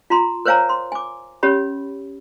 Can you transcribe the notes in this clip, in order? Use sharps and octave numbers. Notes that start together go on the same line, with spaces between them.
F4 A#5 C6
A#4 C5 C#5 F5 G#5 A#5
C6
G#5 D6
C#4 G4 C#5 B5